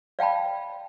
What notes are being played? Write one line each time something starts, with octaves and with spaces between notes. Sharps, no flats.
D5 F5 G5 A5 B5